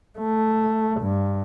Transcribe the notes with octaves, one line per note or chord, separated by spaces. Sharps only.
A3
G2